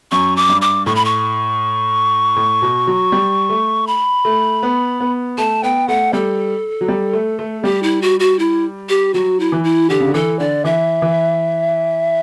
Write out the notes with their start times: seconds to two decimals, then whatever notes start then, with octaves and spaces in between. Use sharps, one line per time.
0.12 F#2 C#6
0.36 D6
0.49 G2
0.62 D6
0.86 A2 C#6
0.95 B5
1.05 C#6
2.36 A2
2.62 B2
2.87 F#3
3.12 G3
3.49 A3
3.87 B5
4.25 A3
4.63 B3
5.00 B3
5.38 A3 A5
5.63 B3 G5
5.88 A3 F#5
6.13 G3 A4
6.81 F#3
6.88 G3
7.13 A3
7.39 A3
7.64 G3 G4
7.83 E4
8.02 F#4
8.20 F#4
8.39 E4
8.89 G4
9.14 F#3 F#4
9.40 E4
9.52 E3
9.64 E4
9.90 D3 G4
10.00 C#3
10.07 D3
10.14 E3 A4
10.39 D3 D5
10.64 E3 E5
11.02 E3